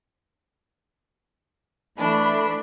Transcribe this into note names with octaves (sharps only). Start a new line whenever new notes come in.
E3 A3 D4 B5